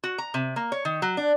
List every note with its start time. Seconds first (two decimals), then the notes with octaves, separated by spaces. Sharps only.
0.04 F#4
0.18 A#5
0.34 C3
0.56 A#3
0.72 C#5
0.85 D#3
1.02 F#3
1.17 D4